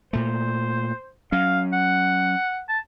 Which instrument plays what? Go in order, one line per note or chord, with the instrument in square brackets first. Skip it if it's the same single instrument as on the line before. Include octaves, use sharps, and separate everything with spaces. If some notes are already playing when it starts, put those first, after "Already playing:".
[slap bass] A#2 A3 [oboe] C5
[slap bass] F#3 C#4 [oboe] F5
[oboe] F#5
A5